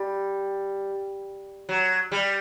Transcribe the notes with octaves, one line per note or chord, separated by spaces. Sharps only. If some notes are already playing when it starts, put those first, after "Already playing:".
Already playing: G3
F#3
G3